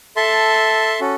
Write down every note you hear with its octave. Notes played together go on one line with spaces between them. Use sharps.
A4 E5 A5 C6
C#4 F#4 A4